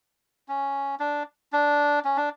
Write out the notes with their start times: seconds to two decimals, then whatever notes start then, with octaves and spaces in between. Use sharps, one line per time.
0.48 C#4
1.00 D4
1.53 D4
2.05 C#4
2.17 D4